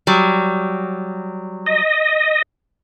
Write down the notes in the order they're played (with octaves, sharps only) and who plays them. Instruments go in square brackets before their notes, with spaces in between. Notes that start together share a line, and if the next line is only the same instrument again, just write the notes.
[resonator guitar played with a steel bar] F#3 G3
[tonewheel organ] D#5